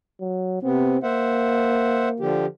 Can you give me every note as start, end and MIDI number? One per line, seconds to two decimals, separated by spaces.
0.21 0.62 54
0.63 0.97 48
0.63 0.97 59
0.63 1.02 60
1.03 2.42 58
1.03 2.09 72
1.03 2.09 76
1.03 2.09 78
2.20 2.46 50
2.20 2.46 53
2.20 2.46 67